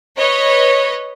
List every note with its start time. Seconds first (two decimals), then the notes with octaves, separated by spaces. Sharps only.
0.17 B4 C#5 D#5